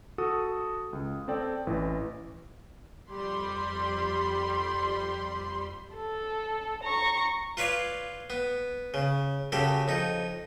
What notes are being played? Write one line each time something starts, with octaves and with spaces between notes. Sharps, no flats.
F#4 A4 D#6
C#2
C4 A4 D5 G5
A1 E3
F2 G3 B5 C6
A4
A#5 C#6
F4 B4 C#5 D5 F5
B3
C#3
F#2 C#3 G4 A4
F2 D#4